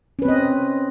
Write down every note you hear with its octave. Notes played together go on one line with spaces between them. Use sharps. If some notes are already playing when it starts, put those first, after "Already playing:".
C4 C#4 B4 D#5